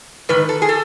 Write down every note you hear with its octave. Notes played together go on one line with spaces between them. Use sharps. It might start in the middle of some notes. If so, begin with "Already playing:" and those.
G#2 D#3 B4
A4
G#4
A4